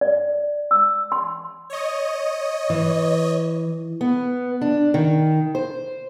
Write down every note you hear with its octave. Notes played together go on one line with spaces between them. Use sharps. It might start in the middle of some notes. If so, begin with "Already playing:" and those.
D5
E6
C6
C#5 D#5
E3
B3
D4
D#3
C5